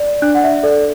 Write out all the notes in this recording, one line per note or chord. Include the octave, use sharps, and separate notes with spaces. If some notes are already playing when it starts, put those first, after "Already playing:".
Already playing: D5
D4 F#6
F#5
E5
A4 D5